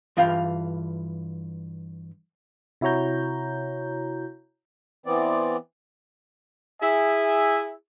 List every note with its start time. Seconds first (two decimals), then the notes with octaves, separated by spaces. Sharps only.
0.17 G2 E3 F4 F5 G5
2.81 C3 E4 F#4 C#5 A#5 G6
5.06 E3 B3 C4 D5
6.81 E4 G#4 E5 G#5